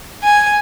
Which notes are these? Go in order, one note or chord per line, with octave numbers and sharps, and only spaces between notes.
G#5